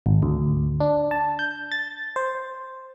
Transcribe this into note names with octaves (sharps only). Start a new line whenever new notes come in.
G#1
D2
D4
A5
G6
A6
C5